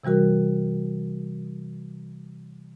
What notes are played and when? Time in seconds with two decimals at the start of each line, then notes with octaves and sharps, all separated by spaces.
0.03 C3 E3 G3 F#4 A#4